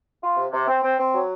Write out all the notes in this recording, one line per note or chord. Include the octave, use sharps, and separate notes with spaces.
F4
C3
C3
C4
C4
C4
F#3